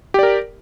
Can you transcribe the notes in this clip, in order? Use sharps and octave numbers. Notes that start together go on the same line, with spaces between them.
G4 A#4 D5